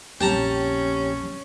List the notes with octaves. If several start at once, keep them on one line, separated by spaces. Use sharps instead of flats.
A#1 F2 C#4 G4 G5 A5 A#5